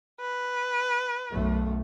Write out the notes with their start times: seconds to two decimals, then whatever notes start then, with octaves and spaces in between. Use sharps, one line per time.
0.20 B4
1.31 B1 F#2 A3